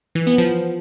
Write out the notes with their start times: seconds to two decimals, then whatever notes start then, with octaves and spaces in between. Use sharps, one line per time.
0.15 E3
0.27 B3
0.38 F3